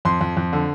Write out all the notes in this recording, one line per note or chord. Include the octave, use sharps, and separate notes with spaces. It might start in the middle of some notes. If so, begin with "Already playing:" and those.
F2 C6
F2
F2
D3